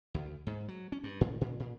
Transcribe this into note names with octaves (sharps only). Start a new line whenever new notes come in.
D2
G#2
F#3
C#4
G2
A2
A#2
A#2